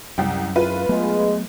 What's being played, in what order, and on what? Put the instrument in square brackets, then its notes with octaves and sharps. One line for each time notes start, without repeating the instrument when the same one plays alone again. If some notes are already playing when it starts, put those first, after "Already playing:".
[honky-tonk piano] C2 G5 [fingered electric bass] F#2
[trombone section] G#1 E3 E4 [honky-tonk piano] F4 B4
[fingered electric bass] F#3 A3 B3 [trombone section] G#3